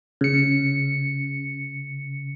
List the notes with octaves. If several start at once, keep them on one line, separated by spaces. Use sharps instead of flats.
C#3 C#7